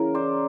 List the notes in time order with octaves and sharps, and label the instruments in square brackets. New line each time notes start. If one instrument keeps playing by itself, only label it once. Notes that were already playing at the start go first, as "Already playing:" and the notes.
Already playing: [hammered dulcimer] C#3 E3 A#4
C5 D5